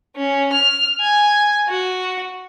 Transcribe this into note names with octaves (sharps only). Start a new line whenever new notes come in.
C#4
F6
G#5
F#4